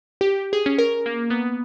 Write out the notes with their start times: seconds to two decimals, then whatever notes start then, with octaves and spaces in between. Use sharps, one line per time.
0.21 G4
0.53 G#4
0.66 C#4
0.78 A#4
1.06 A#3
1.30 B3